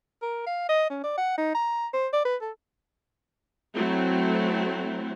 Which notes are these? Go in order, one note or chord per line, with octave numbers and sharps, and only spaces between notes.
A#4
F5
D#5
C#4
D5
F#5
D#4
A#5
C5
D5
B4
A4
F#3 A3 C4 E4